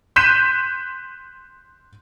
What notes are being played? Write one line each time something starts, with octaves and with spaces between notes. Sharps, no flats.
C6 F#6 G6 B6 D#7 E7